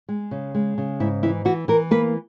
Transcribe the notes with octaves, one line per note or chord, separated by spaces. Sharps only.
G#3
C#3
G#3
C#3
G#2 E4
E3 E4
E3 F#4
E3 A#4
A#3 B4